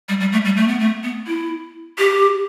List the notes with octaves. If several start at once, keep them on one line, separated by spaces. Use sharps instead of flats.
G3
G3
A3
G3
A3
B3
A3
B3
E4
G4